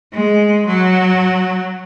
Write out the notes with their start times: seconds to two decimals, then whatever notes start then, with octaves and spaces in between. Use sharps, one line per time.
0.13 G#3
0.66 F#3